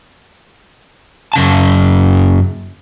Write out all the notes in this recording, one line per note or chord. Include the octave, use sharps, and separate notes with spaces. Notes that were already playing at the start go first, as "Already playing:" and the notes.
F#2 C#3 A5